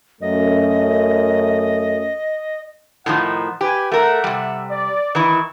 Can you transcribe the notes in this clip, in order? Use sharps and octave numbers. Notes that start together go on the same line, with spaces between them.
F#2 A3 D#5
A2 D#3 F3 D#4 F#5
G4 B4 G#5
A3 A#4 E5 F#5
C3 G3
D5
D#3 E3 E4 B4 E5 C#6